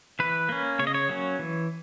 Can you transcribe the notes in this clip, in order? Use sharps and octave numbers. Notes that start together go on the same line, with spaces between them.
E3 B4
A#3 C#4
C#3 C#5
D#5
C#5
F#3 A#3 C#4
E3